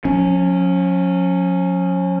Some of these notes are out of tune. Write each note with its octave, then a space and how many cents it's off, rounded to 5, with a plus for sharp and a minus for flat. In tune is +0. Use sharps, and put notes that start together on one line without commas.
F#3 -45 C#4 +0